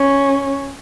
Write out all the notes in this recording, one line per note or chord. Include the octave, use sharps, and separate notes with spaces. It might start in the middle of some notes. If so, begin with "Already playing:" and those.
Already playing: C#4